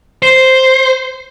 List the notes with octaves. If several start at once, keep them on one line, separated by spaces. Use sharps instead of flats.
C5